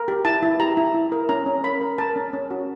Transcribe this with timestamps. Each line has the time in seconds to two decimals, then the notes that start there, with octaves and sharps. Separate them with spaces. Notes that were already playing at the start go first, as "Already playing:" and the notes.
Already playing: A#4
0.08 G4
0.25 E4 A5
0.43 E4
0.60 G4 A#5
0.77 E4
0.95 E4
1.12 A#4
1.29 C#4 A#5
1.46 C#4
1.64 A#4 B5
1.81 A#4
1.98 A#4 A5
2.16 C#4
2.33 C#4
2.51 F#4